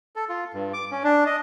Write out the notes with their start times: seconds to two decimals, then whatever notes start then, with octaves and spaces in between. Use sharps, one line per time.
0.16 A4
0.29 F4
0.54 G2
0.73 D6
0.91 C#4
1.04 D4
1.26 D#5